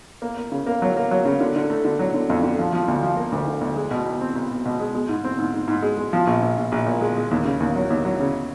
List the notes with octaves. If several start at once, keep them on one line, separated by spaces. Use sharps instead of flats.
A#3
A#3
C#3
A#3
F#3
A#3
F#3
C#3
D3
D3
A3
D3
F#3
D3
F2
D3
F3
F3
D2
F3
A#3
D2
D3
D2
G#3
B2
B1
C4
B1
B1
B2
G#3
G#3
G#2
C4
G#2
G#2
G#2
G#3
G#3
F3
A#1
A#1
A#1
A#1
A#2
G#3
G#3
D#2
C#3
D#2
F#3
D#2
F#3
C#3